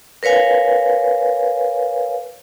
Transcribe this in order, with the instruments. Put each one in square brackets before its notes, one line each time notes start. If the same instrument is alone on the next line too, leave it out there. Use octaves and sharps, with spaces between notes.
[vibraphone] A#4 B4 C#5 F5 G#5